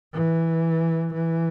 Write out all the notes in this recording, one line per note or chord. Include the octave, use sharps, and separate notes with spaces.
E3
E3